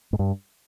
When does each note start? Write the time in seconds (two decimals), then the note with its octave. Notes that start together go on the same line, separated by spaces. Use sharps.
0.13 G#2
0.19 G2